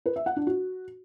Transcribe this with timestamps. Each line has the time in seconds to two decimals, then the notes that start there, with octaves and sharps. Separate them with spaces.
0.06 B4
0.16 E5
0.26 F#5
0.36 D4
0.47 F#4